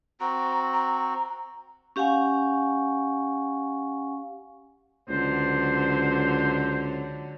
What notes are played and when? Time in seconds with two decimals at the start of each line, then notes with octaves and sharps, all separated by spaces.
0.20 C4 F#4 A#5
0.73 A#5
1.96 C#4 G4 F5 F#5 G#5 C#6
5.10 C#2 D3 F#3 C5